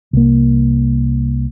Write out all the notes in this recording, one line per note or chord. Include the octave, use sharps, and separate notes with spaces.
C2 A#3